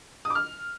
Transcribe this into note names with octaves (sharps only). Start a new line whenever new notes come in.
D#6
D6
F6